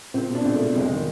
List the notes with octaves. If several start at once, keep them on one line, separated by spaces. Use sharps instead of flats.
C#2 C4
B2
D4
C#2
A3
B2
F1 G#3
D#3